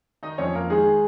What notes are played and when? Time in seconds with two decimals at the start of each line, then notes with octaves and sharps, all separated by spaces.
0.23 D#3 D#4 D#5
0.38 F2 C#4 C#5
0.55 F2 A#3 A#4
0.70 D#3 G#3 G#4
0.86 D#3